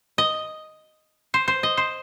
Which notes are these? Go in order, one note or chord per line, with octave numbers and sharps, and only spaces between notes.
D#5
C5
C5
D#5
C5